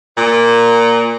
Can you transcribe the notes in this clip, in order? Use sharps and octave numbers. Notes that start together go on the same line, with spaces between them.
A#2